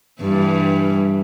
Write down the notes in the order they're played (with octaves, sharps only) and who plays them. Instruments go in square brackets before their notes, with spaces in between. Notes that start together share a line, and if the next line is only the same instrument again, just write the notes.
[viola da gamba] G2 E3 G3